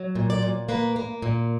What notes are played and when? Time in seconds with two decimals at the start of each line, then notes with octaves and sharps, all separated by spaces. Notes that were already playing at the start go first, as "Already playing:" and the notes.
Already playing: F#3
0.15 A#2
0.30 D5
0.42 A#2
0.69 A#3 B4
0.96 A#3
1.22 A#2